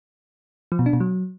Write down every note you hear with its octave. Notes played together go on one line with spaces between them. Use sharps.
F3
B2
D4
B2
F#3